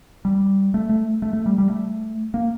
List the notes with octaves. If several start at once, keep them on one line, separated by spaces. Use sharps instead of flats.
G3
A3
A3
A3
A3
G3
G3
A3
A#3